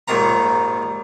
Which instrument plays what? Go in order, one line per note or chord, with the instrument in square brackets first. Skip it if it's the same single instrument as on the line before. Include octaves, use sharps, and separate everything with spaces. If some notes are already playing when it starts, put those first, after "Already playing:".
[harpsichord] A#1 D#2 G#2 D#3 F3 A#5